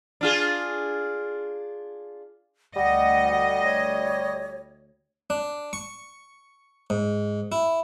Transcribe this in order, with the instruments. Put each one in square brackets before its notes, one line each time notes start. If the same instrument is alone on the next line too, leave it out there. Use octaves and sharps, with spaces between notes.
[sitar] D4 F4 G#4
[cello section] D2 D#5 [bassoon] G3 [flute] F#5
[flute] C#5
[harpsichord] D4
C#6
G#2
E4